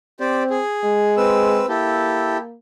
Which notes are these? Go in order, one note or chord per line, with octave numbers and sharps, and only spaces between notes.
C4 G4 C5 D5
G#4
G#3
C4 B4 E6
A#3 E4 G4 A4